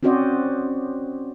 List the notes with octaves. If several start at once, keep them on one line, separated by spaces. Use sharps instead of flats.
C4 C#4 F#4 C5 D5 D#5